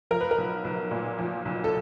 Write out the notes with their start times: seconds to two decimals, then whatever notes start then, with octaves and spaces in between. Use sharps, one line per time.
0.11 F3 A#4
0.21 B4
0.31 A#4
0.38 B1
0.64 B1
0.91 A#2
1.18 F3
1.45 B1
1.64 A4